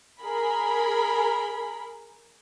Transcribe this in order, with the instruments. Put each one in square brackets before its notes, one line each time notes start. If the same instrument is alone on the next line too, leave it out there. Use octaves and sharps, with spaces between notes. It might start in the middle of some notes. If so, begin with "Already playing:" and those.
[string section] G#4 A#4 B5